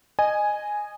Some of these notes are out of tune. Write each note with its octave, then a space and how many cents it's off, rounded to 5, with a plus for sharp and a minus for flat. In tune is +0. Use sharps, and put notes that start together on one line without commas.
D#5 -20 G#5 +0